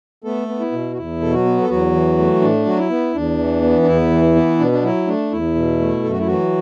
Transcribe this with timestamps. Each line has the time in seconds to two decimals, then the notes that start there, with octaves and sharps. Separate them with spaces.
0.24 A3 B3 A4
0.48 B3
0.60 E4
0.72 B2
0.93 F#4
0.96 E2 E4
1.21 B2 A4
1.32 F#3 F#4
1.45 B3
1.61 A4
1.69 E2 F#3 F#4
1.93 E3
2.18 A3
2.41 A2 D4
2.65 F#3 F#4
2.78 E4
2.90 B3
3.14 E2 D4
3.38 E3
3.62 B3
3.82 D4
3.86 E2 E4
4.10 E3
4.35 B3
4.59 B2 D4
4.72 D4
4.83 F#3 E4
5.07 A3 D4
5.32 E2 E4
5.55 B2
5.79 A3
6.04 F#2 A4
6.11 F#4
6.20 E4
6.26 E3 F#3 F#4